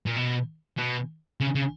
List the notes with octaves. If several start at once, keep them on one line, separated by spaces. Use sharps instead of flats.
A#2
B2
B2
C#3
C#3